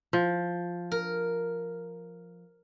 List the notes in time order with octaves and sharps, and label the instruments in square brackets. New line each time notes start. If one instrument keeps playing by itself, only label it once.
[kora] F3
[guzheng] A#4